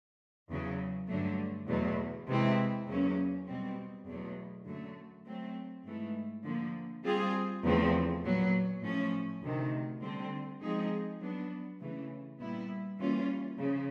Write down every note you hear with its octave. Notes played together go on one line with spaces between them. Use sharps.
E2 C#3 F#3
G2 D3 F#3 A3
E2 B2 F#3 A3
C3 E3 G#3 C4 E4
E2 C#3 F#3 A#3 C#4
B2 G3 C4
E2 B2 F#3 A3
F#2 D3 F#3 A3
F#3 A3 C4
G#2 E3 A3
D3 F3 A#3
G3 C4 F4 G#4
E2 C#3 F3 A3 C4
A#2 F#3 B3
A2 F3 A3 C#4
D2 C3 D#3
D3 G3 C4
F3 G#3 C4 D#4 G#4
F#3 B3 D4
C#3 E3 A3
A#2 G3 B3 E4
E3 G3 A#3 C#4 F4
C#3 F3